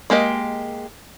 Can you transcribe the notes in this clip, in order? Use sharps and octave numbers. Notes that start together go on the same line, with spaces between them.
G#3 A#3 G4 D#5